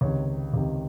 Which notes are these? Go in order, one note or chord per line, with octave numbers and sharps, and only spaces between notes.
C#2 C3 D#3 C#5
C#2 C3 D#3